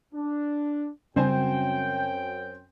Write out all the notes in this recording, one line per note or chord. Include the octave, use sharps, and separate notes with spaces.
D4
F#2 C#3 G3 C4 C5 G5 G#5